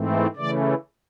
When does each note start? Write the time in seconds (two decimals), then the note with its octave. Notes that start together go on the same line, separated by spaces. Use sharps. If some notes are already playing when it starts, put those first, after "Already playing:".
Already playing: G#2 E3 A3 C4
0.36 C#3 E3 A3 D5